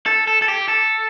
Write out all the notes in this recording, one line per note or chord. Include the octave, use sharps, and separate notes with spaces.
A4
A4
A4
G4
A4